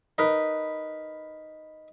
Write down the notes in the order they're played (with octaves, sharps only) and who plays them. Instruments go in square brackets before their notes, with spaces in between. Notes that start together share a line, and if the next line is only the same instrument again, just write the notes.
[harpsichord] D#4 A#4 B4